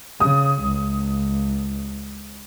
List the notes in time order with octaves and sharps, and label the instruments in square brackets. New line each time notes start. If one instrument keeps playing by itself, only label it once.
[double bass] C#3 [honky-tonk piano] D#6
[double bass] C#2